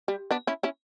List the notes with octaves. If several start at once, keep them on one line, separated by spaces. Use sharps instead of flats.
G3
B3 D4
C#4 E4
C#4 E4